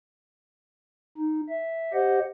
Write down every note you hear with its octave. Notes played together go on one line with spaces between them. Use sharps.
D#4
E5
G4 C5 D#5 F#5